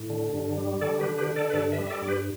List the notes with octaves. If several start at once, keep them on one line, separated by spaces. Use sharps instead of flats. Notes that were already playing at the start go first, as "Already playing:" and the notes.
Already playing: A2
D3
G2
G3
D3 A4 D5
G4 B4
D3
G4 B4
D3
A4 D5
B4
G2 A4 D5
B4 E5
G3
E5
A4 D5
G2 D5
G4 B4